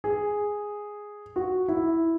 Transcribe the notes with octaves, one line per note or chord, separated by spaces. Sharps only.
G#4
F#4
E4